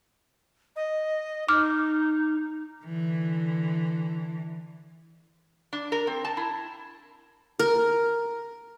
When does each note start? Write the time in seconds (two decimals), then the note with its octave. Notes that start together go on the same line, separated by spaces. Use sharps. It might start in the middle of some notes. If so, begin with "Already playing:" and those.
0.76 D#5
1.49 D#4 D6 F6
2.84 D3 E3
5.73 D4
5.92 A#4
6.07 C4
6.24 A5
6.37 E4
7.59 A#4